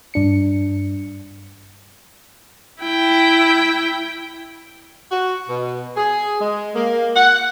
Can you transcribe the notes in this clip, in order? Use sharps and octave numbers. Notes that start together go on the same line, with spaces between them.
G2 D4 C#7
E4 G5
F#4
B2
G#4
G#3
A#3
F#5